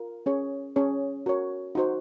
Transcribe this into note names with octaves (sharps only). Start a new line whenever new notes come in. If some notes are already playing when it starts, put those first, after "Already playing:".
Already playing: F4 A#4
C#4 G#4 C#5
C#4 G#4 C#5
F#4 A#4 C#5
D#4 F#4 C5